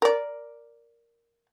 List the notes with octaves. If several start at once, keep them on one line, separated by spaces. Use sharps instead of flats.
A#4 D5